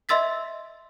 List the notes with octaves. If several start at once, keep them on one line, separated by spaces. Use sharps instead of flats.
D#5 E5 C6 E6 A6 B6